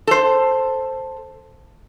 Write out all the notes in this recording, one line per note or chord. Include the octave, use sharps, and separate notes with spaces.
A4 C5